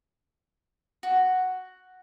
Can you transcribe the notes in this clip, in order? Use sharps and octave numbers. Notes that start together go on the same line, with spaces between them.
F#4